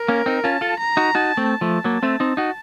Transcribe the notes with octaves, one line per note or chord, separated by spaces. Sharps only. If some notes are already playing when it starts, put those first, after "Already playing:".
Already playing: A#4
A#3 C#4
C4 D#4
C#4 F4 A5
F4 A4
A#5
D#4 F#4
D#4 F#4 A5
A3 C4
A5
F3 A3
F#3 A#3
A3 C4
C4 D#4
D#4 F#4